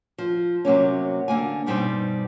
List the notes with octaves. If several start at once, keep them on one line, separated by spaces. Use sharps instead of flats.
F3
C3 F#3 A#3 C#4
D3 A#3 G#5
G2 B2 G3 C4 C#4 D#4